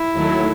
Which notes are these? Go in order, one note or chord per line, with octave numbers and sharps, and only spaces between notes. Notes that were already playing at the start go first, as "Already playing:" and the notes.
Already playing: E4
D#2 D#3 F#3 A3